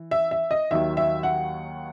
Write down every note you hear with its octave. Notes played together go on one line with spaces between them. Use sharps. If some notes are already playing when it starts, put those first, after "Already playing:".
Already playing: E3
E5
E5
D#5
D#2 D#3 F#3 E5
E5
F#5